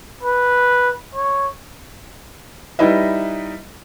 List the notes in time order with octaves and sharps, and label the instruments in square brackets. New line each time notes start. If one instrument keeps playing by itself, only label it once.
[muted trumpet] B4
C#5
[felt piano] G3 D#4 E4 B4 D#5 E5